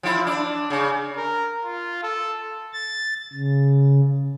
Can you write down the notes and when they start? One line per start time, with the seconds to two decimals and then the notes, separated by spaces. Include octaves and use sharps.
0.03 F3 E4
0.27 D4
0.70 C#3
1.17 A#4
1.65 F4
2.03 A4
2.73 A6
3.33 C#3